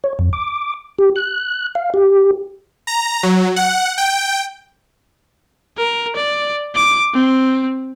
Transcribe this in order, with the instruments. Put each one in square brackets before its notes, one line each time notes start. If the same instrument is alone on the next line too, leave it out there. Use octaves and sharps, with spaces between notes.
[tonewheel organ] C#5
F2
D6
G4
F#6
F5
G4
[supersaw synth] A#5
F#3
F#5
G5
[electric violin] A#4
D5
D6
C4